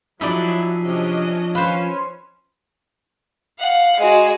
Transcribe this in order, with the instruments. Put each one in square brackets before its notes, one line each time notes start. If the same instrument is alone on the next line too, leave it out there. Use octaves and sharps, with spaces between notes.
[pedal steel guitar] F3 G#4 E5 [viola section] F#3 [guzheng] D#4 D5 [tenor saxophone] E4
[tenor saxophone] C3 [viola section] C#4 D4 D#5
[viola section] C#4 [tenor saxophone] F4 [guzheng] B4 C5
[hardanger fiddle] F5 F#5
G#3 F#4